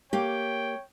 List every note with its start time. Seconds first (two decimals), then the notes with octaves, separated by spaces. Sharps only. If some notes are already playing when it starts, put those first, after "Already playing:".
0.13 A#3 G4 C#5 G5